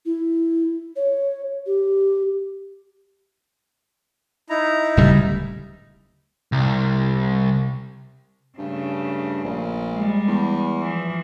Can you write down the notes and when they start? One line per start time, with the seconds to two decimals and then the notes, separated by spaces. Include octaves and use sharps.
0.05 E4
0.96 C#5
1.66 G4
4.50 D#4 E4 A#5
4.97 D1 C#3 G3
6.52 C2
8.58 G2 C#3 A3
9.44 A#1
9.92 G3 G#3
10.28 E2
10.80 E3 F3